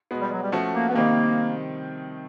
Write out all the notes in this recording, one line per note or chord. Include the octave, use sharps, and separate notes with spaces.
B2 G#3 B3
G3
F#3
G3
F3 A3 C#4 F#4
A#3
B3
C3 D#3 G3 A#3 C4 D#4